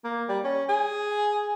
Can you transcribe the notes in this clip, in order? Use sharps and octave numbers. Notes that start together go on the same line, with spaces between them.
A#3
G3
C#4
G#4